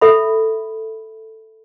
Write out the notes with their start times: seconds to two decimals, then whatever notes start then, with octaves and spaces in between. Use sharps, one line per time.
0.01 A4 E5 B5